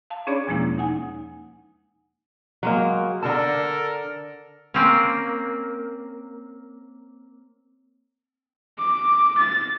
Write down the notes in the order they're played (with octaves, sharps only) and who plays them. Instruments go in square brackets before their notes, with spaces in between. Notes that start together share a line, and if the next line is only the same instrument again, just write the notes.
[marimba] F5 A5
C#4 D4 G#4 C#5 D5 B5
E2 B2 F3 G#3 A#3 E4
D#4 F#5 G#5
[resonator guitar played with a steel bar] F#3 G#3 A#3
[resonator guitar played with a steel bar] D3 A5 [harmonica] A4 A#4
[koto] A#3 C4 C#4
[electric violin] D6
A6